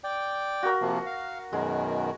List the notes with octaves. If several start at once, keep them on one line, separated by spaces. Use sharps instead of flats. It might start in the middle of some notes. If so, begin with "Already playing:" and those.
D5 G5
F#4 A#4
C3 F3 A#3
F5
F#2 B2 D#3 G#3